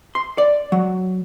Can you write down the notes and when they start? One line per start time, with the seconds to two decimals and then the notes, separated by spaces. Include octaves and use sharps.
0.15 C6
0.38 D5
0.72 F#3